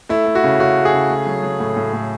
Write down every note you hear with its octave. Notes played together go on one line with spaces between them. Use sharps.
A3 E4
A3
F#4
C#3
C#3 F#4
A3
G#4
C#3
A3
F#3
F#3
A2
A2
A2